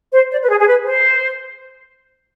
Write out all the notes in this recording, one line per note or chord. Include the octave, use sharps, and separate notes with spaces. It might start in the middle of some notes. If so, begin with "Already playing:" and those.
C5
D5
B4
G#4
G#4
B4
C5